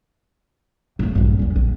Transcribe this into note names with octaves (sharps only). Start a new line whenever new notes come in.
A2 A3
A#1 G2
E2 C#4
A#1